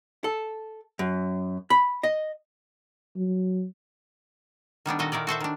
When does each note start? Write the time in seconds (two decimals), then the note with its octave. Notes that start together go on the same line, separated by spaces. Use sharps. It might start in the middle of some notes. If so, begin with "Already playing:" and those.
0.24 A4
0.99 F#2
1.70 B5
2.03 D#5
3.16 F#3
4.86 D#3 G3 B3 D4
4.99 A#2 D#3 F#4 A4 D#5
5.12 A#2 D#3 E4 A#4 D5
5.27 F#4 A4 C5 E5
5.40 D#3 D4